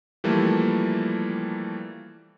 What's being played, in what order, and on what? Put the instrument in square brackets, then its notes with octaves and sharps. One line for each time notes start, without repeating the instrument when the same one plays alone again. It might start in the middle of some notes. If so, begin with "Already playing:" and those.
[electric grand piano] E3 F3 G3 A3 A#3